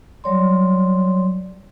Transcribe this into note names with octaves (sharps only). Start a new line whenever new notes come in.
F#3 G3 C#5 D5 C6